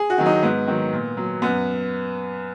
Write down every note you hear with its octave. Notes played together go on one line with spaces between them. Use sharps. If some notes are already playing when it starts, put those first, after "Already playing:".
Already playing: G#4
F#4
D#3 F#3
D#4
G#2 B3
D#3 F#3
A#2
F#3
F#2 B3